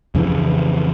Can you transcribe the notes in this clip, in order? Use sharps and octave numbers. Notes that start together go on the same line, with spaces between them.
F2 C#3 E3